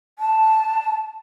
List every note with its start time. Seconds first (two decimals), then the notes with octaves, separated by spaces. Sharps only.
0.19 A5